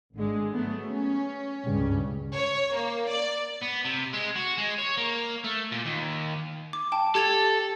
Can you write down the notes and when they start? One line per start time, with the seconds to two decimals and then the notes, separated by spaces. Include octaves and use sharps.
0.15 G#1 D3 G#3
0.53 F#3 A3 B3
0.86 C#4
1.64 C#2 G2 C#3
2.34 C#5
2.75 A#3
3.08 D5
3.62 B3
3.85 C3
4.14 G#3
4.36 F#4
4.58 G#3
4.79 C#5
4.97 A#3
5.44 A3
5.72 A#2
5.85 D#2
6.73 D6
6.92 G5 A5
7.15 G4 A4 G#6 F7